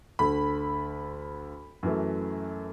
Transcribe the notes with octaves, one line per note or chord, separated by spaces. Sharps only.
D2 D3 A3 B5
F#2 E3 A3